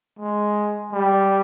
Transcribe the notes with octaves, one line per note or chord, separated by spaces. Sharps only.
G#3
G3